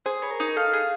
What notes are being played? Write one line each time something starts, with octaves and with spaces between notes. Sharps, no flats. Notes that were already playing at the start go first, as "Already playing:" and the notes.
G#4 C5
B4 C#5
A#4
D#4
A4 F5
G#4